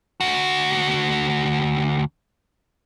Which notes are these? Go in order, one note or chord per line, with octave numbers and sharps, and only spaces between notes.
D2 F#4